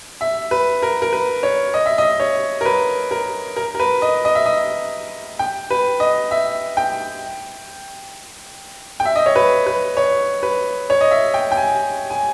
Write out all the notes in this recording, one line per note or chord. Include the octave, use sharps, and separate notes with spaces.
E5
B4
A#4
A#4
B4
C#5
D#5
E5
D#5
C#5
A#4
B4
A#4
A#4
A#4
B4
D#5
D#5
E5
D#5
G5
B4
D#5
E5
G5
G5
E5
D#5
C#5
B4
B4
C#5
B4
C#5
D#5
E5
G5
G5
G#5
G#5